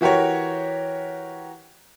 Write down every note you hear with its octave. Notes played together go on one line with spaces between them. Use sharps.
E3 F#4 G4 A#4 C#5